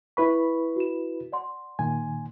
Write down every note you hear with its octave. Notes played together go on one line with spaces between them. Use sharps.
E4 B4 B5 C#6
F#4 E7
D5 F#5 C6
A#2 D#3 G#5